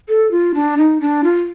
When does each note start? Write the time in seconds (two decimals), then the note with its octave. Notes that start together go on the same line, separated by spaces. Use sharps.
0.09 A4
0.31 F4
0.54 D4
0.78 D#4
1.01 D4
1.24 F4